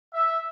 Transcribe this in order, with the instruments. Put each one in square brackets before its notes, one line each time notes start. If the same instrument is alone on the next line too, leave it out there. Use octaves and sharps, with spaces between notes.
[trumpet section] E5